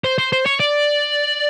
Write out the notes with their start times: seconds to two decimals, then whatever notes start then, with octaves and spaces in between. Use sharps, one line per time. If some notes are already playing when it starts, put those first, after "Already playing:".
0.04 C5
0.18 C5
0.32 C5
0.46 C#5
0.60 D5